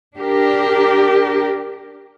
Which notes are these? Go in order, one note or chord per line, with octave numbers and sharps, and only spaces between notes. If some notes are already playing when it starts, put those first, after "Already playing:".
D4 G4 A#4